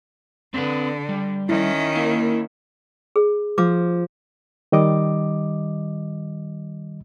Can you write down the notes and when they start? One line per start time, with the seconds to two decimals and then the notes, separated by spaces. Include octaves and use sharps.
0.54 D3 C4 B4
1.09 G3
1.49 D#3 C#4 E4
1.96 A#3 E4
3.16 G#4
3.58 F3 D6
4.72 D#3 G3 D#5 D6